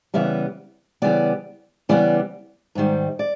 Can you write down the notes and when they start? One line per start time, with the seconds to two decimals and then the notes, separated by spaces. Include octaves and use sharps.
0.14 C#3 E3 G3 B3 E5
1.02 C#3 E3 G3 B3 D5
1.89 C#3 E3 G3 B3 D5
2.75 G#2 D#3 G3
3.19 D5